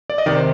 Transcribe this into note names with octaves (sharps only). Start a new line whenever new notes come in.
D5
D#5
C3 D#3 D5
C5